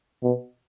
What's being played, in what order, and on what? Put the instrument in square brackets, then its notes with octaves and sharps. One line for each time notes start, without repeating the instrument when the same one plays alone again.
[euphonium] B2